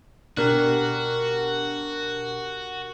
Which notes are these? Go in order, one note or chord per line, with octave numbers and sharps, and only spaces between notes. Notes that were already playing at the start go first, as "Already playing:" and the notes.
B2 D4 F#4 G4 A#4 F#6